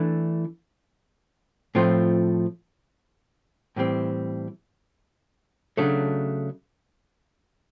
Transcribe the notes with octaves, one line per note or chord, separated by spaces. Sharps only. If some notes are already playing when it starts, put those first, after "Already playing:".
Already playing: E3 A3 D4
A2 F3 A3 C4 F4
A2 E3 G3 C4
C#3 F#3 A3 D4